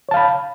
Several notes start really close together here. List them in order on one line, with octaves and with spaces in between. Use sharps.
C#5 A5 F5 B5